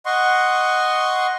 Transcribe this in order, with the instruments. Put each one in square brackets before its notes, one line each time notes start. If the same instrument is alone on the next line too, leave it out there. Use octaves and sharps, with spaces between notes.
[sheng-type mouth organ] D#5 F#5 C6 C#6